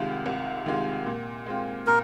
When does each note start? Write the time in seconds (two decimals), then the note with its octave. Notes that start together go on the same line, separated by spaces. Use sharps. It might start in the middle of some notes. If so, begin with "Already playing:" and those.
Already playing: C2 C3 D#3 G#3 F4
0.26 C2
0.66 C3 D#3 G#3 F4
1.06 A#2
1.46 G#3 C4 F4
1.87 A#2 A#4